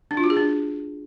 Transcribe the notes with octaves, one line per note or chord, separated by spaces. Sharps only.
D4
F4
F#4
G#4
D4